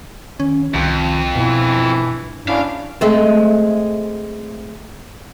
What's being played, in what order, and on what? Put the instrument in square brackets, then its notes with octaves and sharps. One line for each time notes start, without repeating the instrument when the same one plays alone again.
[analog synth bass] D#3 [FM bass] C#4
[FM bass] C2 [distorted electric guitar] F2 [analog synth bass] D#3
[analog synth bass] G2 [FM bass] B2 [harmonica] E3
[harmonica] C#4 D4 E4 [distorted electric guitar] F5
[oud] G#3 A3 C4